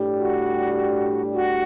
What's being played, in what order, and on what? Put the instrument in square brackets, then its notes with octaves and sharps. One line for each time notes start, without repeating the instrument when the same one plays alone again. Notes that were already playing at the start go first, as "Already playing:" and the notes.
Already playing: [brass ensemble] A2 G3 D4 G4
[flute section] F#4
F#4